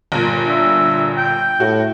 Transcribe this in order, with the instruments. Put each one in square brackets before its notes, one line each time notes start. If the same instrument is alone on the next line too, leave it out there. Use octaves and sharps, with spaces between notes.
[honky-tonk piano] G1 A#2
[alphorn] D4 [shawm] E5
[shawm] G5
[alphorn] A2 [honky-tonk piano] F#4